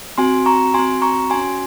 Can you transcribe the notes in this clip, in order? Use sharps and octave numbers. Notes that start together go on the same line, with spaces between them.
C4 F#4 G#5 C6
A#5 C#6
C4 F#4 G#5 C6
A#5 C#6
C#4 F#4 G#5 C6